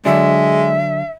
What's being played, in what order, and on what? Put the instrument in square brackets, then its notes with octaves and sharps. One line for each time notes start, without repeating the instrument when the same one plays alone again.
[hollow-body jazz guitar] D3 F#3 D4 [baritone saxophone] G#3 [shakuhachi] E5